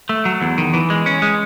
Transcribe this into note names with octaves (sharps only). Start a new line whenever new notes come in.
A3
F#3
E2
D#3
E3
G#3
C#4
G#3